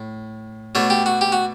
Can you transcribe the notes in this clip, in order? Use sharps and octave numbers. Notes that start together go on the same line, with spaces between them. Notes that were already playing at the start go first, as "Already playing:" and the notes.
Already playing: A2
B2 A3 D4 C#5
G4
F#4
G4
F#4